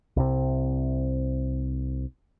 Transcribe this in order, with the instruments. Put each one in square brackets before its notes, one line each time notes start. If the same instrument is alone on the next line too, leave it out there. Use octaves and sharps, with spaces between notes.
[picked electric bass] C2 C3